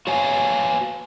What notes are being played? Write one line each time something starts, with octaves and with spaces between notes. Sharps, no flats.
F#4 C#5 F5 G#5